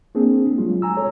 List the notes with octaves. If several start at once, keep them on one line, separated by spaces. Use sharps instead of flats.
A#3 C4 D4 G#4
F#3 G#3 F4
G#5 A#5 E6
A4 C#5